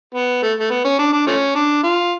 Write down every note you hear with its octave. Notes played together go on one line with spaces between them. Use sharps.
B3
A3
A3
B3
C#4
D4
D4
F3 A3 C#4
D4
F4